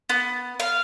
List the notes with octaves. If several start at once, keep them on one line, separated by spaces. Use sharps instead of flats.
B3
F5